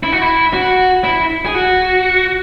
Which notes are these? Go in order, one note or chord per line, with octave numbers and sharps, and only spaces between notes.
E4
F#4
E4
F#4
E4
G#4
F#4